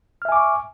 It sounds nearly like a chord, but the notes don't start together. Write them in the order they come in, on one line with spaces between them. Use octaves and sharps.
F6 E5 G#5 D6 C#6